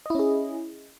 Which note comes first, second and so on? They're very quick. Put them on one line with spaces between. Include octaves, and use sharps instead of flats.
D#5 E4 C#4 G#4